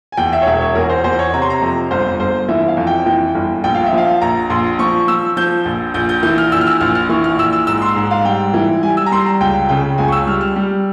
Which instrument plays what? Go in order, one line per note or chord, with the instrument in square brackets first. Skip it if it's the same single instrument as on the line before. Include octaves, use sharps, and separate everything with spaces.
[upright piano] G#5
E2 G5
E5
C#5
E1 E5
C#5
E2 A#4
C5
E2 C5
C#5
C3 A#5
C6
A#5
F2
G1 C5
G1 C5
E3 E5
F5
F2
G5
E3 G5
G1
A#1 G5
F5
E5
F3 F5
A#1 A#5
A#1 C6
F3 C#6
F3 E6
F3 G6
A#1
A#1 G6
G6
E3 G6
F6
A#1 E6
F6
E6
A#1 F6
F6
E3 C#6
F6
A#1 E6
E6
G#2 E6
C6
G#2
F5
G3 G5
E3
G3 G#5
E6
A#5
G3 C6
A#5
C#2 G5
C#3 G5
C#2 G#5
C#6
E6
G3 F6
F6
G3